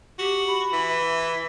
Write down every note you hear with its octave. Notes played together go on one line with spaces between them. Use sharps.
F#4 G4
B5
E3
E5